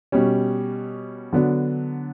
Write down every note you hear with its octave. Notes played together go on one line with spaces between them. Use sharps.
B2 G3 C#4
D3 F#3 B3 D4